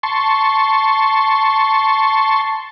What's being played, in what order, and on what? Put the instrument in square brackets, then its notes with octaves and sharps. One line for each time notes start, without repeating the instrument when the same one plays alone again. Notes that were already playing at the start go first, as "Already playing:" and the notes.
[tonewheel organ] A5 C6 C#6